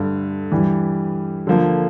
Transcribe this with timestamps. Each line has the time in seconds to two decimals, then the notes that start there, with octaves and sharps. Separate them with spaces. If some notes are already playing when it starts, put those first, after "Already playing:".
Already playing: G2 D3 A3
0.52 G2 E3 G3
1.47 D3 F3 A#3